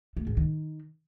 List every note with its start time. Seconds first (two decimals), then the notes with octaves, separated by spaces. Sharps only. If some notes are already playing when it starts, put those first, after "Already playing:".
0.17 A3
0.27 G#2
0.37 D#3